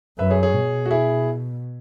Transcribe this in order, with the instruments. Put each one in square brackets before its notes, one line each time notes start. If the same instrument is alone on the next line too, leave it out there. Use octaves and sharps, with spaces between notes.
[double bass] F#2 [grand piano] B4 E5
[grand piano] G#4 C#5
G#4 C#5
[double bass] B2
[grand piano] F#4
E4 G#4